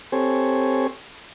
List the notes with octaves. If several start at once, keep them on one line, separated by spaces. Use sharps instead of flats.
C4 G4 A4 C5 C#5 G#5